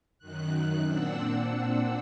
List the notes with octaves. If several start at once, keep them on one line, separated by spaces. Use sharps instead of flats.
F#2 D#3 F#6
A#2 C4 D4 F#5 E6